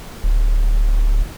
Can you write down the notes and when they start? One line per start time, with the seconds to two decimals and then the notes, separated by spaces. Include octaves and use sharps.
0.24 D1